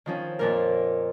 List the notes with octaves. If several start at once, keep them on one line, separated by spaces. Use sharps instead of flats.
D#3 F3 C#4
F2 A#2 A#4